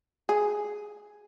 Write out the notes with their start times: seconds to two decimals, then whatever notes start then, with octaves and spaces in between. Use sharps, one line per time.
0.29 G#4